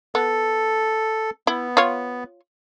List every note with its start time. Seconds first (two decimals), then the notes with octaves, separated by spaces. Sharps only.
0.15 B3 A4
1.47 B3 E4
1.77 F4 C#5